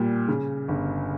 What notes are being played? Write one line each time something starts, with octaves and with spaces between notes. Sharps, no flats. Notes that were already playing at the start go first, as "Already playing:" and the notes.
Already playing: A#2 G3
C#3
G1